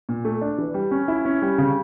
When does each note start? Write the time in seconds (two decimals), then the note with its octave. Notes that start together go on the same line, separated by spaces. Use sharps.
0.09 A#2
0.25 A3
0.41 D4
0.58 E3
0.74 G3
0.91 C#4
1.08 E4
1.25 C#4
1.42 G3
1.58 C#3